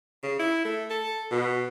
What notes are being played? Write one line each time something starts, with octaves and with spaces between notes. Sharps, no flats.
C#3
E4
A3
A4
B2